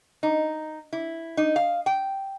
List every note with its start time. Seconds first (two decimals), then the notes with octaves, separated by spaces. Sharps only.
0.23 D#4
0.93 E4
1.37 D#4
1.56 F5
1.86 G5